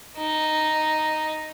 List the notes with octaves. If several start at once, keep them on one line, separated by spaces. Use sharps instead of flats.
D#4